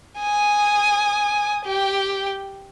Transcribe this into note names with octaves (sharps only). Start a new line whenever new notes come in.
G#5 D#6
G4 G5